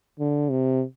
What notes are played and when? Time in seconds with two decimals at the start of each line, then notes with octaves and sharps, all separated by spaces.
0.19 D3
0.51 C3